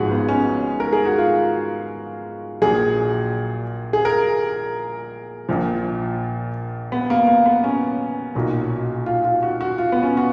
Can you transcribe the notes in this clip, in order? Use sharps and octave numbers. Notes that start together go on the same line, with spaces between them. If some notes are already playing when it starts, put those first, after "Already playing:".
Already playing: G#1 G#2 F3 F#4 G#4
B3
C#4
A#4
G#4
F#4
F4
A#1 A#2 F#3 G#4
G#4
A#4
A#1 A#2 F3
B3
A#3
A#3
B3
C#4
B1 A#2 F#3
F4
F4
F#4
F#4
F4
B3
C#4
F#4